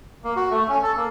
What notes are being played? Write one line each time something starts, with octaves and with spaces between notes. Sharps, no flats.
A#3
F#4
A3
C#4
A4
A#3